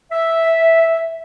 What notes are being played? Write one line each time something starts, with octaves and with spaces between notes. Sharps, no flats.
E5